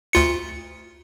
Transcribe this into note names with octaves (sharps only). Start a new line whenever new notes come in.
D2 F4 C#7